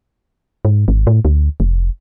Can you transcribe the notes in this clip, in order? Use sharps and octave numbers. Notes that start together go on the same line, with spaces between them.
G#2
G#1
A2
D2
F1